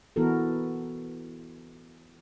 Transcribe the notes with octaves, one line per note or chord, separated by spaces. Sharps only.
E3 B3 E4 F#4 A4 A#4